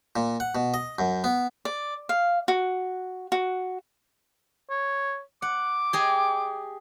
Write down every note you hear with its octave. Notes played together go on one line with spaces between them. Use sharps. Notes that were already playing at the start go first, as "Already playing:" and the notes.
A#2
F#5
B2
D#5
F#2
B3
D5
F5
F#4
F#4
C#5
F#5 D6
G4 G#4 D#5